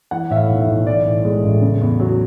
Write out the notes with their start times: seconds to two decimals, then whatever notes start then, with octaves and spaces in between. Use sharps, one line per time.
0.11 E3 F#5
0.30 A2 E5
0.36 F5
0.49 B1
0.61 E5
0.68 B1
0.87 E3 D5
1.06 A2
1.24 G#3
1.44 A1
1.62 C#3
1.81 E2
2.00 F#3